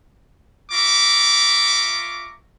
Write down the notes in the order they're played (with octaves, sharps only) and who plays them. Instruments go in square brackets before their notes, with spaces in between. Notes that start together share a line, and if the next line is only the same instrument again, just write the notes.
[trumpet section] F4 E5 A#5 C#6 D6